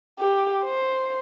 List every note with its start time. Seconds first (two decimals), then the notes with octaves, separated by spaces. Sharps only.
0.19 G4
0.64 C5